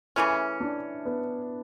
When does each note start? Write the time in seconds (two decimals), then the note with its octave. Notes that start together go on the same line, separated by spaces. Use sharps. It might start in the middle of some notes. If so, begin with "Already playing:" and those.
0.16 C#3 E3 A3 C#4 E4
0.60 D4
1.05 B3